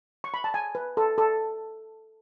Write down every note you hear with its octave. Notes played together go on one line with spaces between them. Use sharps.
C#6
B5
A5
G#5
B4
A4
A4